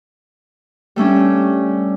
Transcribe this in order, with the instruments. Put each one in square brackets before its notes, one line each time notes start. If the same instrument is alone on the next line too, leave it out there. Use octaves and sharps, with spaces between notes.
[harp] G3 A3 C#4 D4